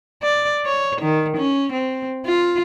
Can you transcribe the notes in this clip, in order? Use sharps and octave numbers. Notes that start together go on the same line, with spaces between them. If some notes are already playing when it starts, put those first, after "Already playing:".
D5
C#5
D#3
C#4
C4
F4